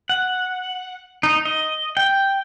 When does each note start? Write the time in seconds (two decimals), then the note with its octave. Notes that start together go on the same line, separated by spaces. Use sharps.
0.09 F#5
1.23 D#4
1.45 D#5
1.97 G5